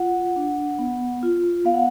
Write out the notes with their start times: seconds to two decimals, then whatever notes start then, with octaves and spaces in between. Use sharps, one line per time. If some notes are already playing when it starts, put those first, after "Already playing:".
Already playing: F4 F#5
0.36 D4
0.79 B3
1.23 F4
1.65 B3 F5
1.74 F#5